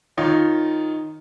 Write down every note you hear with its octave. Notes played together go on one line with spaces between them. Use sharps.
D#3 D#4 F4 C#5